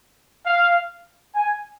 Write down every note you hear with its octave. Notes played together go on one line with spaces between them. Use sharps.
F5
G#5